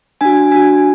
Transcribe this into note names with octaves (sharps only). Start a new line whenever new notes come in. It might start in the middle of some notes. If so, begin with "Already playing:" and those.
D4 F#4 G#5
D4 F#4 G#5